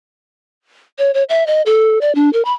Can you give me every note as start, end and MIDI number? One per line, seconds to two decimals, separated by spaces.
0.98 1.11 73
1.14 1.23 73
1.29 1.46 76
1.47 1.62 75
1.66 1.99 69
2.01 2.14 74
2.15 2.30 62
2.33 2.44 70
2.45 2.52 83